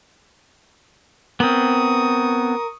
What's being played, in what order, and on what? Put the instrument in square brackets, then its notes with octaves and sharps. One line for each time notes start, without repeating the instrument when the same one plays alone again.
[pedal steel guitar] B3 C4 [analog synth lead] A#4 [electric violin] C#6 D#6